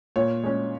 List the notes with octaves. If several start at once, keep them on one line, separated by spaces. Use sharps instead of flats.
A#2 C#5
G#3 C#4